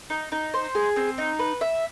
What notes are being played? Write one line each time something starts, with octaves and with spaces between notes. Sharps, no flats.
D#4
D#4
C5
G#4
C4
D#4
B4
E5